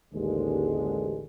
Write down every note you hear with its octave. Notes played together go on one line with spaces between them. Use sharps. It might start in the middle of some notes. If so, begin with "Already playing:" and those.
A1 D#2 D3 G#3